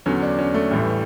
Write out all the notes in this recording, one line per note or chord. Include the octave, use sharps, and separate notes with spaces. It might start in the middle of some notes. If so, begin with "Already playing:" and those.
E2 D3 F#3 C#4
D4
C#4
A3
A1 A2 E3 G3